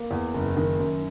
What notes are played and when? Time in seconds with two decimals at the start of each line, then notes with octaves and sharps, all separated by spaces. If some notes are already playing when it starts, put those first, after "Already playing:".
Already playing: A#3
0.11 E2
0.34 F#1
0.57 D#3
0.79 F#2